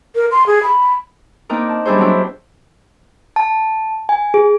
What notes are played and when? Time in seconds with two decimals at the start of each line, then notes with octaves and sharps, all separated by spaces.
0.15 A#4
0.32 C6
0.47 G#4
0.63 B5
1.49 A#3 C4 D4 D#4 A#4
1.69 A5
1.85 G3 D4 E4 G#4 C5
1.98 F#3 C4 D4 E4
3.36 A5
4.09 G#5
4.34 G#4